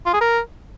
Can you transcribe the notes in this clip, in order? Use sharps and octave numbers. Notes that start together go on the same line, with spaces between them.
F4
G#4
A#4